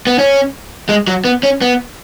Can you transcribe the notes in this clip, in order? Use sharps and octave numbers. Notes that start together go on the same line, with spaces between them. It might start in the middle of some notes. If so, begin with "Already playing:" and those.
B3
C#4
G#3
F#3
B3
C#4
B3